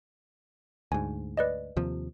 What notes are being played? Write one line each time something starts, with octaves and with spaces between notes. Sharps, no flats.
D2 G#2 G#5
B4 D5 D#5
D#2 C3 F3